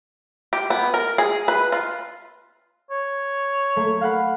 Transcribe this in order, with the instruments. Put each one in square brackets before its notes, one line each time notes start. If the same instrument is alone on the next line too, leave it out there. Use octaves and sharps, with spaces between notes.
[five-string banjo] G4
B3
A#4
G#4
B4
F4
[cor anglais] C#5
[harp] A3 A#3
F5 F#5 B5